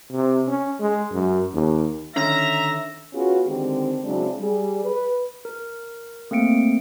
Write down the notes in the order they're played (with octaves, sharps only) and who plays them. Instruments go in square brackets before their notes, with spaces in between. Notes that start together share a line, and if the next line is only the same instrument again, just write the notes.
[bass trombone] C3
C#4
G#3
F#2
D#2
[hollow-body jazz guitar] D3 D#3 C#4 [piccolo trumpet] E5 [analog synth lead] A#5 [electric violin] A#6
[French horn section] B3 C#4 F4 F#4 G#4
D3 D#3 G#3 C4 G4
C#3 F#3 G#3 C4 D4 E4
G3 G#4
B4
[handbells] A#4
A3 A#3 C4 C#7 D7